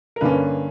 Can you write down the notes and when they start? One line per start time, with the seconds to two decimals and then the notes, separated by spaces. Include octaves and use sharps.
0.16 A#4
0.21 G2 D3 A#3 C#4 B4